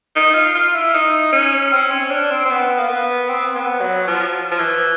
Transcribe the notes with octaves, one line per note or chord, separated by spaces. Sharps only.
D#4
F4
F4
E4
D#4
C#4
C4
C#4
D4
C4
C4
B3
A#3
B3
C4
B3
F#3
F3
F3
E3